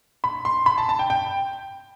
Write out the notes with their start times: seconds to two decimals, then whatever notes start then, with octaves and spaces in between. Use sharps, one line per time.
0.24 B5
0.45 C6
0.66 B5
0.78 A5
0.89 A5
0.99 G5
1.10 G5